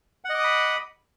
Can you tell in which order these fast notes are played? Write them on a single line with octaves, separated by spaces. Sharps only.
F#5 D#5 D6 D#6 B5